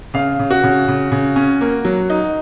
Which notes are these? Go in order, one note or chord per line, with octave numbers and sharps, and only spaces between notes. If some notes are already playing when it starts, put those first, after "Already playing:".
C#3 F5
C#3
F#4
C#3
C#3
C#3
C#4
A#3
F#3
D#4